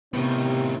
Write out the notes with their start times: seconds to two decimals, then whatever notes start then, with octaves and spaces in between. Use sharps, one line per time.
0.14 A2 C3 D#3 B3